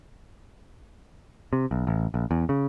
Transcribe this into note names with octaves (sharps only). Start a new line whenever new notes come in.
C3
B1
A1
A#1
E2
C#3